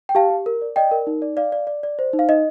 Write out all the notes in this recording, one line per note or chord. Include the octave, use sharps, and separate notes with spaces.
G5
G4 F5 A5
G4
A#4
D5
D5 D#5 G5
A#4
D#4
D5
D5 F5
D5
D5
D5
C5
D#4
F5
D#4 D#5